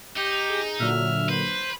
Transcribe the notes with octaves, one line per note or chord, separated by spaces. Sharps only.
D#4 G4
G#4
A#2 D3 F#3 E5 F6
B4 C5